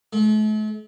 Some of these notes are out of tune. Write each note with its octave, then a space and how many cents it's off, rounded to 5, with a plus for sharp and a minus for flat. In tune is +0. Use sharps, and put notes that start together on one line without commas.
A3 -45